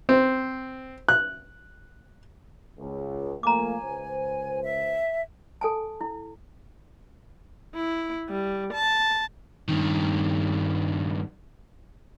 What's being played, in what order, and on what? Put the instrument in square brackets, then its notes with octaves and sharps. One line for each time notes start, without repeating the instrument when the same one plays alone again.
[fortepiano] C4
F#6
[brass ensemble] C#2
[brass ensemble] F3 A3 A#3 [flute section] G#5 [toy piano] A#5 D6
[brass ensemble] C#2 C5
[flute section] E5
[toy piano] A4 G#5 A5
E4
[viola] E4
G3
A5
[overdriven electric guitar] G2 D#3